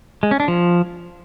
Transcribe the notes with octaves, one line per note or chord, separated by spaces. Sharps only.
G#3
C#4
D4
F3